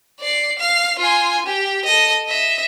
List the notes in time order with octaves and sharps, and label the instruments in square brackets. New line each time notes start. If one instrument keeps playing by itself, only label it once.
[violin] D5 C7
F5
F4 G#5
G4
A4 D#5
D#5 E5